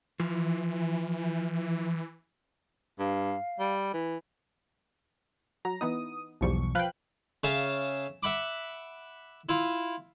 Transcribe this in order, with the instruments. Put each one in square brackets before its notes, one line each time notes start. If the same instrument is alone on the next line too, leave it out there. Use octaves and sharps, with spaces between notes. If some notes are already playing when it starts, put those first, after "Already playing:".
[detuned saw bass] E3 [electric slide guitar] F3
[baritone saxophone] G2 [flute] F5
[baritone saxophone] G3
E3
[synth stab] F#3 [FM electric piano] A#5
[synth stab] E3 B3 D#4 [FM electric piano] D#6
[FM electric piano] B1 E2 C#6 [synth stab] G#2 F3 G3
[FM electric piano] F3 B4 F#6 [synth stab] F5 G5
[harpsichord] C#3 E5 F5 A5
E5 F#5 B5 D6
E4 F4